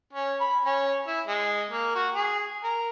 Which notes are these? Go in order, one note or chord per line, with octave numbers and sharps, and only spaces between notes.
C#4
B5
C#4
E4
G#3
A#3
F#4
G#4
A#4